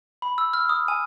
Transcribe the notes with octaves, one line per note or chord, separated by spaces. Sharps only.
B5
E6
F6
D#6
G#5